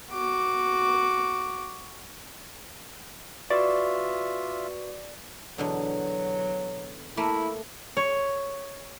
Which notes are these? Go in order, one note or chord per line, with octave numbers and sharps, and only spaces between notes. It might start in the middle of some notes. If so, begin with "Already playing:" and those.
F#4 D6
F4 F#4 B4 D5 E5 C#6
E2 B2 D3 F#3
A3 A#3 E4 A#4
C#5